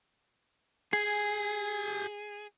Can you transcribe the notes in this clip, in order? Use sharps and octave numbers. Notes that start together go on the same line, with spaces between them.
G4 G#4 G#5